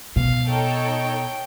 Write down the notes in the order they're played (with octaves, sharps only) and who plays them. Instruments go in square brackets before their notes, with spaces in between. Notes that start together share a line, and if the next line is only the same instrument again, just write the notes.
[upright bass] B2 [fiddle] F5
[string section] D#4 A4 C#5 [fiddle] G5